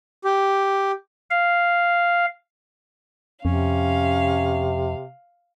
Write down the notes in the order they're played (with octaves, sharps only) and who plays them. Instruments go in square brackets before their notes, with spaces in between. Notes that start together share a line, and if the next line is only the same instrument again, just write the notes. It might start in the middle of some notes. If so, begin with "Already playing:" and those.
[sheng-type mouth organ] G4
[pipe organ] F5
[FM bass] F2 [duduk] C3 [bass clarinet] C#4 [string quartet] F5